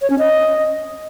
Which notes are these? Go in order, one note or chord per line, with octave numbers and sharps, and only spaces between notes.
C#5
C#4
D#5